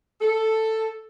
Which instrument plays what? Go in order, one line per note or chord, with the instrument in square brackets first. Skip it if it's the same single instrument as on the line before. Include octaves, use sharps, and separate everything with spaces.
[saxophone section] A4